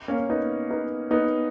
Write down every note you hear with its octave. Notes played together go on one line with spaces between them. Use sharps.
A#3 C#4
B3 D#4
B3 D#4
B3 D#4